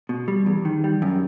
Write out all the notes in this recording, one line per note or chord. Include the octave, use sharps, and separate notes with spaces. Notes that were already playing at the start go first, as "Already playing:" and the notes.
B2
G3
E2
D#3
G3
F#2